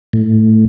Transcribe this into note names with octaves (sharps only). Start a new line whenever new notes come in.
A2